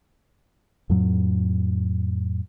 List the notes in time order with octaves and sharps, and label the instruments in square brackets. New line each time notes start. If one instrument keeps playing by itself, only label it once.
[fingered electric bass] F2 A2 F#3